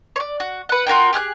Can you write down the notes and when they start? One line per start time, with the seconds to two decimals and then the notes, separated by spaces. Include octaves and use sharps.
0.16 C#5 D5
0.40 F#4
0.69 B4 F#5
0.87 F4 F#4 A#4 G5
1.13 G4 G#4 F6 F#6